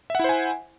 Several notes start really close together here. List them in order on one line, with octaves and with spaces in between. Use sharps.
E5 F#5 E4 C5 G#5